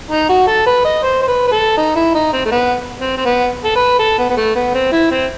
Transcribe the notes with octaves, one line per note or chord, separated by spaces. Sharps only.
D#4
F#4
A4
B4
D#5
C5
C5
B4
B4
A4
D#4
E4
D#4
C4
A3
B3
C4
C4
B3
A4
B4
A4
B3
B3
A3
B3
C4
E4
C4